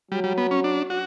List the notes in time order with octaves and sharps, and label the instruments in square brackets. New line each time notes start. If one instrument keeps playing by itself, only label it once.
[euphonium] F#3 [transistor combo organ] G3
[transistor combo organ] G3
B3
C#4
D4
F#4